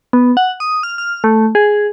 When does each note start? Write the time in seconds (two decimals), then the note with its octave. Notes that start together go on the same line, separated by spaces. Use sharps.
0.13 B3
0.37 F#5
0.60 D#6
0.83 F6
0.98 F6
1.24 A3
1.55 G#4